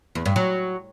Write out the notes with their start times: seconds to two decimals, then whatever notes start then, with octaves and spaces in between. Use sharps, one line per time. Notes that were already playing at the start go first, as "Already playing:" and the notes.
0.15 E2
0.26 G2
0.36 F#3